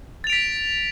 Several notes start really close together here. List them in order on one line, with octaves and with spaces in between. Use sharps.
A6 F7 D7 B6